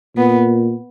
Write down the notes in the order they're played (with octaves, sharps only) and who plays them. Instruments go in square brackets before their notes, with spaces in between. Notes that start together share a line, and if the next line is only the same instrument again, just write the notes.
[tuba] A#2 [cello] B3